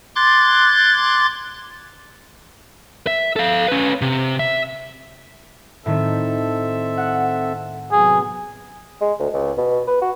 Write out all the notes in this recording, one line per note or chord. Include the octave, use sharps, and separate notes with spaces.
C6 D6 F#6 G#6 A6
E5
A4 F5
C#4 B4
C3
E5
A2 D#3 A3 C4 A4 E5
F#5
C3 F#3 B3 G#4
G#3
D2
C#2
B2
B4
F#4